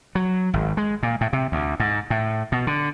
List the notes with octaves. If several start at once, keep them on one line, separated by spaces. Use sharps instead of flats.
F#3
G#1
G#3
A#2
A2
C3
D2
G#2
A2
B2
D3